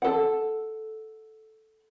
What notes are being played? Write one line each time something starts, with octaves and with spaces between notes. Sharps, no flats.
A4 F#5